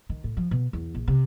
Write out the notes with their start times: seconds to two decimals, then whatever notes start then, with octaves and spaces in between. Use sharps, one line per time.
0.10 D#3
0.24 A2
0.37 F3
0.51 B2
0.73 E2
0.95 A#1
1.08 C3